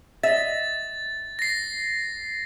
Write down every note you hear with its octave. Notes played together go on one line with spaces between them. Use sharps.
D#5 E5 A6
A#6 C7